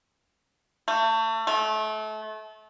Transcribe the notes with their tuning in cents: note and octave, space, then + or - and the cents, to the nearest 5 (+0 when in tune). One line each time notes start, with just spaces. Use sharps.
A3 +30
A3 -30